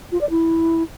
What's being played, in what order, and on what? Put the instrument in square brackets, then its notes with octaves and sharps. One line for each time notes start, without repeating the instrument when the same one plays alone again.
[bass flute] F4
D5
E4